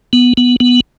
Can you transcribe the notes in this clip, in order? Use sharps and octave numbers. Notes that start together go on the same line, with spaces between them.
B3
B3
B3